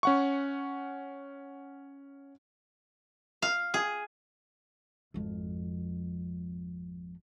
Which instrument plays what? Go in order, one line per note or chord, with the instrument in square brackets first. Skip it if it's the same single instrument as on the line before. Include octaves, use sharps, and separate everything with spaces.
[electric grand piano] C#4 F#5 C#6
[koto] F5
G#4
[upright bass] G#1 F2